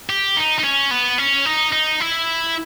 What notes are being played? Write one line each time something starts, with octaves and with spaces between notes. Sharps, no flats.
G4
D#4
D#4
C#4
B3
C#4
D#4
D#4
E4